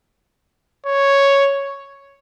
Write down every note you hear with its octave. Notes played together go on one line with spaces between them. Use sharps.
C#5